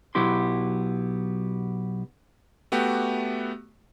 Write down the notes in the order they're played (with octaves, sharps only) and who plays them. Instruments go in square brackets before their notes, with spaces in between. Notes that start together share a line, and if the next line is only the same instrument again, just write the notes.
[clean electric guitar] B1 F#3 B3 E4 G4 C6
[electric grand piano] A3 B3 F#4 G4